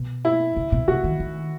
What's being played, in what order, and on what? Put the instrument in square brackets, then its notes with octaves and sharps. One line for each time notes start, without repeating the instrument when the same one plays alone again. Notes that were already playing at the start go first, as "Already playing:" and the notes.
Already playing: [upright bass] B2
[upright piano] E4
[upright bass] C#3
B2
[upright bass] C#3 [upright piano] F#4
[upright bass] D#3
D#3